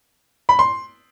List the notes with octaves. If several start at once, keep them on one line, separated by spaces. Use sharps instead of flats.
B5
C6